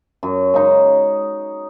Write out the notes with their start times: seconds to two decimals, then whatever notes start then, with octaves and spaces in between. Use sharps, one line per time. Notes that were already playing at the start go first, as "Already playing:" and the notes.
0.23 F#2
0.54 C#3 G#3 D#4